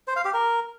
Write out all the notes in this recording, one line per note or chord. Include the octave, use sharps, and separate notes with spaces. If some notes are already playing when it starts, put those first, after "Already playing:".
C5
F5
G4
A#4